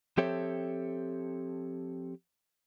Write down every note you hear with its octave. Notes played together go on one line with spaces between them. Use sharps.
F3 C4 G4 A4 C#5 E5